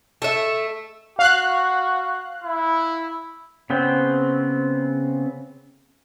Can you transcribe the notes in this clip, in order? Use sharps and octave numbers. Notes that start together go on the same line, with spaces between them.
A3 E5
F#4 F5 F#6
E4
C#3 B3 C4 G5